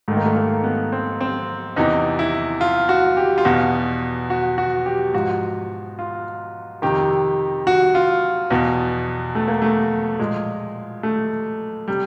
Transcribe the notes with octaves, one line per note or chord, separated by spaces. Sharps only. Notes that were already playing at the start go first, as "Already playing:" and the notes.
G#2 D#3 A3
A#3
A3
A#3
B3
C4
C4
E2 C3 E3 D#4
E4
F4
F#4
G4
F4
E2 B2 F#4
F#4
F#4
G4
G#2 F3 F#4
F4
F2 C3 D#3 G4
F#4
F4
E2 B2
A3
A#3
A3
A#2 F3 G#3
A3
C3 G3